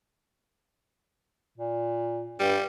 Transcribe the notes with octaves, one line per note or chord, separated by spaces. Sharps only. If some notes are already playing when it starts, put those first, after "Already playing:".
A#2
G2 G3